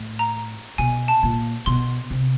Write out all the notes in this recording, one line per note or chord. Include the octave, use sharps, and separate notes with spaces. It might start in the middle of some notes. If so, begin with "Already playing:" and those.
Already playing: A2
A#5
B2 G#5
A5
A#2
B2 C6
C3